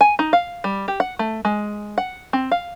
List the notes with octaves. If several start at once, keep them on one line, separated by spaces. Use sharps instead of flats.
G#5
D#4
F5
G3
G4
F#5
A3
G#3
F#5
C4
F5